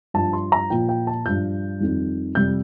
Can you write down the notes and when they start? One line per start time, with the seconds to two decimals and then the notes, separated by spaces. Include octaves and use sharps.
0.14 G2 F3 A5
0.33 C6
0.52 A#5
0.70 A#2 F3 G5
0.89 G5
1.07 A5
1.25 G2 F3 G6
1.80 F2 D#3 G3
2.35 F2 C3 G3 G6